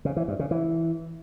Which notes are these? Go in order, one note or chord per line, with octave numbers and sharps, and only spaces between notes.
C#3
E3
G2
C#3
E3